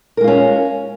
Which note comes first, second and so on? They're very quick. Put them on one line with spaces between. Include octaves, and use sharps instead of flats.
A#4 G#3 F4 C#4